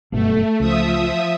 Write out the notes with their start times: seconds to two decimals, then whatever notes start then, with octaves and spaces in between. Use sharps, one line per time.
0.12 F#1 G2 B2 A3
0.60 C#2 F3 E5 D#6